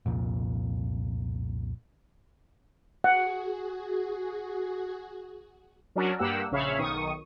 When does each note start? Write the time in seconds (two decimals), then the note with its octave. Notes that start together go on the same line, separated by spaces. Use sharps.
0.06 C2 F2 A#2
3.04 F#4 G#4 F#5
5.96 F#3 C#4 D4 F#4 A#4
6.19 G2 A#3 G4 F#5 E6
6.51 A#1 C#3 C#5 E5 F5 B5
6.79 B1 D#3 C#6 D#6